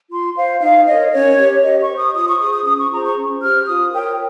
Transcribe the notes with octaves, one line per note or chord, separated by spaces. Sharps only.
F4 C6
C5 F5
D#4 F5
A#4 C#5 D#5
C#4 C#5
G4 A#4
G4 D#5
C#6
C5
D#6
F4 D#6
C#6
G#4 D#6
C5
D#6
C#4 D#6
C#6
F4 G#4 C5 A#5
C#6
C#4
G4 C5 F6
F4 D#6
A#4 C#5 G5